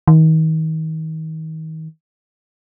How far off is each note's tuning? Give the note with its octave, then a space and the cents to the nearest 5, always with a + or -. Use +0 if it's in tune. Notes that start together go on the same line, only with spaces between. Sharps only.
D#3 +35